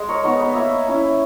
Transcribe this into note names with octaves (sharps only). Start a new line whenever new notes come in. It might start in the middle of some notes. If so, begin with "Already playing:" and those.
Already playing: G#3 D#5
A#4 C#5
B3 D#4 A#4 C#5
B4 D#5
A#3 C#5 E5
C#4 E4